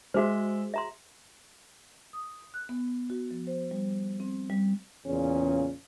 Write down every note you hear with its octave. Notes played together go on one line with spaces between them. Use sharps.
G#3 F#4 G#4 C5 E5
E5 A#5 C6
D#6
F#6
B3
F#4
F3
C5
G3
C4
G3
E2 A#2 C#3 C#4